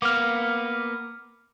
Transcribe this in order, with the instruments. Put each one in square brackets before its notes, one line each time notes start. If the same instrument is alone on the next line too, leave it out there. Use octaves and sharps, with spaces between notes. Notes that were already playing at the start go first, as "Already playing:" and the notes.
[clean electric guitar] A#3 B3 [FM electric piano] D6 F6